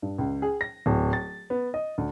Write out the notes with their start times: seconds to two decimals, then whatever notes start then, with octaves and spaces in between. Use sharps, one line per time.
0.02 G2
0.18 C#2
0.42 G#4
0.61 A#6
0.86 D1
1.13 A6
1.50 B3
1.74 D#5
1.98 D2